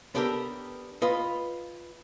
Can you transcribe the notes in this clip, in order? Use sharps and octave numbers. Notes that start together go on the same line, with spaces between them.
B3 D4 G4 A4 A#4
F4 B4 D#5